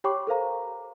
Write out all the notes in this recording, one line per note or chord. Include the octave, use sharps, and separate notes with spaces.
G4 C#5 G5 B5 C#6 D6
A4 A#4 C5 F5 A#5